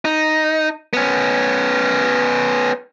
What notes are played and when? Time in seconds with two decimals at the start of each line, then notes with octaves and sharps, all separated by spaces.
0.05 D#4
0.93 B3 C#4